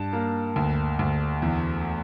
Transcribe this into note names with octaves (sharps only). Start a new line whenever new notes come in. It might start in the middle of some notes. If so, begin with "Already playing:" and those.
Already playing: G2 A5
A#3
D2
D2
E2